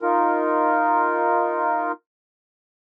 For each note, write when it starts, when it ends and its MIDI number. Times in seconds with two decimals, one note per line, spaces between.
0.02 1.92 63
0.02 1.92 65
0.02 1.92 70